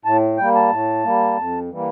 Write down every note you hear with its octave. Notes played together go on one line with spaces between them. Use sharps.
A2 A5
G3 A#3 G5
A5
A2
G3 A#3
F2
E3 G3 A#3